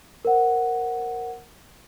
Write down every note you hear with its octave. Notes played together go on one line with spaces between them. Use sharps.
A#4 C5 F#5